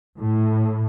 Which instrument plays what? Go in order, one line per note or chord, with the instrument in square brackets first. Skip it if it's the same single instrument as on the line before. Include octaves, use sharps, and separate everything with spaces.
[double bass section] A2